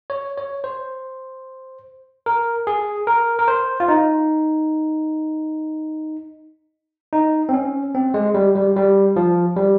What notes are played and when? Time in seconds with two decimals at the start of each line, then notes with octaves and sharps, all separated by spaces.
0.10 C#5
0.38 C#5
0.64 C5
2.26 A#4
2.67 G#4
3.07 A#4
3.39 A#4
3.48 C5
3.80 F4
3.88 D#4
7.13 D#4
7.49 C4
7.53 C#4
7.95 C4
8.14 G#3
8.34 G3
8.55 G3
8.76 G3
9.16 F3
9.56 G3